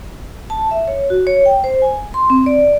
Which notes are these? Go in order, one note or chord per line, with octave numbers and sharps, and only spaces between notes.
A5
E5
C#5
F#4
C#5
G5
C5
G#5
C6
C4
D5